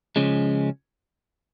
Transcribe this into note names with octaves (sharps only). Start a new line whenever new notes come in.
C#2 C#3 F3 G#3 C#4